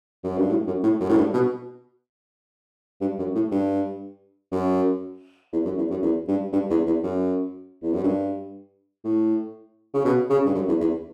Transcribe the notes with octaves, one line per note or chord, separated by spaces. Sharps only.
F#2
G2
A2
F#2
A2
F#2
A2
G2
B2
G2
F#2
A2
G2
F#2
E2
F#2
E2
F#2
E2
G2
G2
E2
E2
F#2
E2
F#2
G2
A2
C#3
B2
C#3
G2
F#2
E2
E2